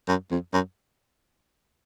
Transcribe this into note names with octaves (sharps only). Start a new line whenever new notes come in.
F#2
F2
F#2